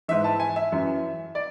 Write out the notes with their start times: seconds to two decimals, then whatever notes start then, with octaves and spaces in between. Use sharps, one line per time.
0.08 G#2 E3 E5
0.24 A5
0.39 G#5
0.56 E5
0.72 F#2 E3
1.35 D5